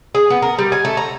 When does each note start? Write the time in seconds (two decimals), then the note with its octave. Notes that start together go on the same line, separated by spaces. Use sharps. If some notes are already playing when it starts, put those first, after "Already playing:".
0.15 G#4
0.30 B3
0.42 A#4
0.58 G3
0.72 G#5
0.85 A3
0.97 A#5